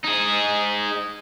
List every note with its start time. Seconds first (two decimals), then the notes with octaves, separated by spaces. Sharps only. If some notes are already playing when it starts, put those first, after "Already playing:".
0.04 D#4 G#4